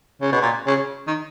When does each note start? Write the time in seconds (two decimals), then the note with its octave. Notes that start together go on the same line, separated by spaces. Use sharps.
0.21 C#3
0.32 B2
0.42 A#2
0.67 C#3
1.07 D#3